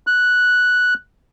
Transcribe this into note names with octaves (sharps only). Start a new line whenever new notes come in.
F#6